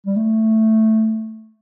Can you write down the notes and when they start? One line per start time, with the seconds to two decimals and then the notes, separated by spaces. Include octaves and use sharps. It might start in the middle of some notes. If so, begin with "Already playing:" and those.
0.06 G3
0.16 A3